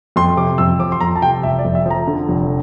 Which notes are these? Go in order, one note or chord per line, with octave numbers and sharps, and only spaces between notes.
F2 C6
C3 D6
F2 E6
F3 D6
C6
F2 A#5
A5
C3 G5
F1 E5
D5
F2
E5
F3 A#5
D3
F1